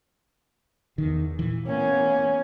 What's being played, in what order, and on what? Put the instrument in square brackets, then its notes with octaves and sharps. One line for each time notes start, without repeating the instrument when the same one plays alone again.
[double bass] E2 [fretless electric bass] D#3
[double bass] A#2 [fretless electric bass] E3
[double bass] A#3 B3 [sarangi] C#4